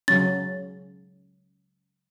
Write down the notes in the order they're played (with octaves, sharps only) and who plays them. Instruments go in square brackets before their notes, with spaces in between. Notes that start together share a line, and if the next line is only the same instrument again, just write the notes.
[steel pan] C#3 F#3 C#4 [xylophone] A6